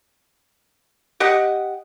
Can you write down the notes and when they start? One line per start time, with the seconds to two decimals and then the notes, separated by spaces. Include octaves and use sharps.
1.20 G4 D#5 F#5